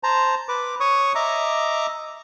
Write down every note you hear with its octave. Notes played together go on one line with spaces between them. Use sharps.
C5 A5 A#5
B4 D6
C#5 C#6 D#6
D#5 E5 A#5 D6